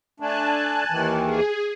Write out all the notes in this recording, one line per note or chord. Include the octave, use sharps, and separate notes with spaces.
A3 D4 G#5 A5 F#6
D#2 D#3 E3
G#4